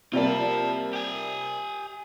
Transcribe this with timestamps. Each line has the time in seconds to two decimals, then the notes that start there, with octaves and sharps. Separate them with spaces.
0.13 C3 G3 A#3 F4 A5
0.93 G4 G#5